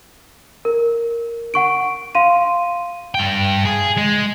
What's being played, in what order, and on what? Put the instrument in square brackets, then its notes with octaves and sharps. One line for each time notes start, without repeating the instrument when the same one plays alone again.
[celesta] A#4
F#5 C#6 D7
F5 C6 D#7
[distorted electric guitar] G2 G5
G#4
G#3